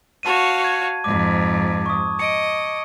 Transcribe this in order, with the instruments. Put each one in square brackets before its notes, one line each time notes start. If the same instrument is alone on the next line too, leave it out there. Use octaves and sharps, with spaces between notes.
[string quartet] F#4 C#5 F5 [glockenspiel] A5 D#7
[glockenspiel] G#6
[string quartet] F2 G#2 [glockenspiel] D6
[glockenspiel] C#6 D#6
[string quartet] D#5 [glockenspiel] C#7 D7